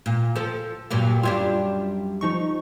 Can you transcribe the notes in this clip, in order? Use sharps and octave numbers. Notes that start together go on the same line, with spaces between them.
A#2
F3 A4
G2 A#2 F#3
F#2 G3 D4 F4
F3 D#4 C#6